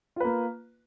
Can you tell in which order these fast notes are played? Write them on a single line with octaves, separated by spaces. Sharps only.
F4 B4 A#3